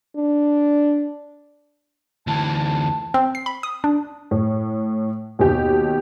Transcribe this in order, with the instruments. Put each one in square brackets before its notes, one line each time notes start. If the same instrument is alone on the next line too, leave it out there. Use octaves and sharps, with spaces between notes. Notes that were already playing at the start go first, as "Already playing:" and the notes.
[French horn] D4
[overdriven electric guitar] D2 E3 [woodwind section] A5
[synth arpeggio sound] C4
C7
B5
D#6
D4
[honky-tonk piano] A2
D#2 B2 G4